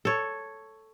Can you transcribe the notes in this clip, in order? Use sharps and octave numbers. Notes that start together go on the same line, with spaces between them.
A4 C#5